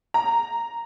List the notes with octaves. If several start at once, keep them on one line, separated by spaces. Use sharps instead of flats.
A#5